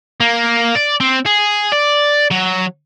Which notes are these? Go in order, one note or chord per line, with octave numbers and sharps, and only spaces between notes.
A#3
D5
C4
G#4
D5
F#3